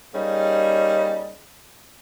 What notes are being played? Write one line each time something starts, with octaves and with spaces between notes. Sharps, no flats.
G3 A#3 C#4 D#4 G#4